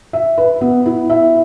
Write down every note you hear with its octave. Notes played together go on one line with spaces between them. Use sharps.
E5
B4
B3
E4
E5